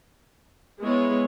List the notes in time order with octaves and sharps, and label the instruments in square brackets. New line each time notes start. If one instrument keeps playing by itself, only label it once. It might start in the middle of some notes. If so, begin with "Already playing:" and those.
[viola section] G#3 B3 E4 C#5